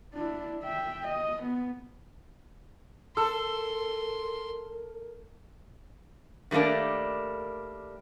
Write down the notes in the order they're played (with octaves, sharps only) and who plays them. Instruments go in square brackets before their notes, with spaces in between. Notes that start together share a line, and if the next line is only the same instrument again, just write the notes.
[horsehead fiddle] D4 E4
E5 G5
D#5
B3
[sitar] A4 [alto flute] A#4 [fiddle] C6 [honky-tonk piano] E6
[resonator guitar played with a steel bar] D#3 G3 A3 A#3 D4